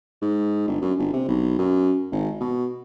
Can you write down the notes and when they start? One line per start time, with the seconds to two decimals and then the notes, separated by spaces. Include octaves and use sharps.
0.22 G#2
0.68 G1
0.82 F#2
0.99 G1
1.13 C3
1.28 B1
1.59 F#2
2.12 G#1
2.41 B2